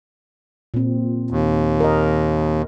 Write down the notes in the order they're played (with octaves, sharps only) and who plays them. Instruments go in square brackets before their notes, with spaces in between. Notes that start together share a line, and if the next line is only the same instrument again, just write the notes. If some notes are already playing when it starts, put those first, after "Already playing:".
[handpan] A#2 C4
[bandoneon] D#2
[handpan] A#4 D#5